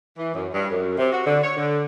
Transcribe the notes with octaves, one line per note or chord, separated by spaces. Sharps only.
E3
F#2
G2
F#2
C3
F#4
D3
C#5
D3